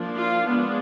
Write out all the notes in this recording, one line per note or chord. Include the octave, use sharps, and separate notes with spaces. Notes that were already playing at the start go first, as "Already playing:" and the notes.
Already playing: F3 A#3 D4
F4
F3 G#3 B3 D4